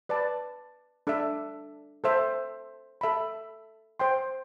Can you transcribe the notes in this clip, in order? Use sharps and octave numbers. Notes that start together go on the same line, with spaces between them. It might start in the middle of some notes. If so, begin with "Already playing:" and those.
B4 D5 A5
D4 A4 E5
A4 C5 E5
A4 E5 B5
C5 G5 C6